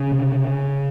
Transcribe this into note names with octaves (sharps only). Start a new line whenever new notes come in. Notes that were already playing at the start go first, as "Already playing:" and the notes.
Already playing: C#3 C#4
C3